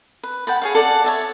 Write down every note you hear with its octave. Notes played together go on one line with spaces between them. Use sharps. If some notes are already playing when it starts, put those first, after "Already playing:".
B4
F#5 G5 A5 B5
G#4 C#5 F5
A4 D5 F#5
C#5 E5 A5